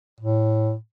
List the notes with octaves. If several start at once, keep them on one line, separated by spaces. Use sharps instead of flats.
A2